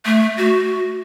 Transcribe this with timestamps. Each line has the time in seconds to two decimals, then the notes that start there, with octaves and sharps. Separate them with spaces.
0.06 A3
0.38 F#4